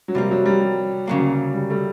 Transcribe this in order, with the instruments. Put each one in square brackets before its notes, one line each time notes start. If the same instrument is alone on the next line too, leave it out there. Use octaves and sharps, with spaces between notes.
[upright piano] F#3
[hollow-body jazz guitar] C3 F3 A#3 [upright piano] G3
[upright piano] F#3
G3
G3
[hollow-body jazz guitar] D2 C#3 F#3 A#3
[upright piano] G3
G3 A3